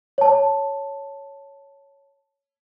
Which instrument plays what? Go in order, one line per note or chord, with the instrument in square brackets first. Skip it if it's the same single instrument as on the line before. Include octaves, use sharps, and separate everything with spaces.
[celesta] C#5 A5